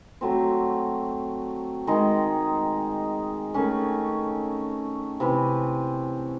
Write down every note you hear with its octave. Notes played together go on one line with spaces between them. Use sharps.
F#3 A3 C4
D#3 G#3 D#4
D#3 A3 C#4
C3 E3 C4